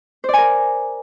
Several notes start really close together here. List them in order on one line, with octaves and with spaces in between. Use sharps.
C5 D5 G#5 A#4